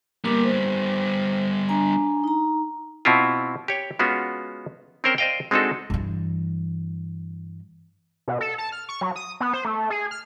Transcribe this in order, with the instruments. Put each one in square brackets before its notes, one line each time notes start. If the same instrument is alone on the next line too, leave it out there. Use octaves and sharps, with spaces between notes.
[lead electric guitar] G3 B3 [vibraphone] A#3 A#4 D6
[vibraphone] C5
D4 G#5 A#5
D#4 A#5
[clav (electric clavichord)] B2 C4 E4 F4
G4 C#5 G5
G#3 B3 C#4 F4 F#4
C4 C#4 A#4 C5 G5
C5 D5 D#5 F5 G5
G#3 C4 D4 D#4 F#4 A4
[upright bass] G2 E3
[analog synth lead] B2
A4
A5
F6
C#6
F#3
D#6
B3
C5
A3
G#4
F6